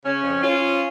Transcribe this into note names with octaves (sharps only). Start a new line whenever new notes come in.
C#3 C#4
F2
F3 C#4 F4
F3